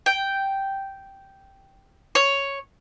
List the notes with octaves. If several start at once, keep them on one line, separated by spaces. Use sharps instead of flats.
G5
C#5